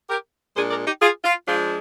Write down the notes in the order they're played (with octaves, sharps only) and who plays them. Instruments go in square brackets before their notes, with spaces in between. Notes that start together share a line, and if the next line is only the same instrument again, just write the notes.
[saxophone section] G4 A#4
A#2 G#3 D4 G#4 C5
A#4 D5
D#4 G4
F4 G#4
F4
F3 G#3 D4 F4